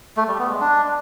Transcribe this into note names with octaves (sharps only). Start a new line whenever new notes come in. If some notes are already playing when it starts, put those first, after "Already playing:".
A3
G3
B3
G#3
D4